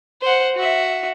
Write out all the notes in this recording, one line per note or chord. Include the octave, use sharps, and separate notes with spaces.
C5 F#5
F#4 E5